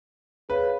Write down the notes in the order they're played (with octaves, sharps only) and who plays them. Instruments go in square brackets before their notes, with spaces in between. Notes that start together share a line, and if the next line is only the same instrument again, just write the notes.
[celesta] G#4 C#5 F5 B5 [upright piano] B4